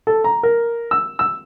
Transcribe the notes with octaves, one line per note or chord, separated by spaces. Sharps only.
A4
A#5
A#4
E6
E6